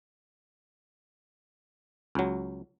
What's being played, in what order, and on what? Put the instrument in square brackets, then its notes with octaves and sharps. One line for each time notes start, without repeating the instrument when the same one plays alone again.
[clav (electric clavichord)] C#2 F#3